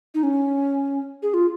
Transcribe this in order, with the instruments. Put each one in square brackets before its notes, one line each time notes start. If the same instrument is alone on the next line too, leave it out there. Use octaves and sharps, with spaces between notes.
[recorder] D#4
C#4
G#4
F4